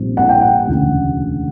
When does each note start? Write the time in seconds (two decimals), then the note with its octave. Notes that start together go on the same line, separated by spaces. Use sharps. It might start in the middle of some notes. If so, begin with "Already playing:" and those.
Already playing: A#1 A#2 G3 C4
0.17 F#5
0.29 G5
0.42 F#5
0.67 E1 D2 C#3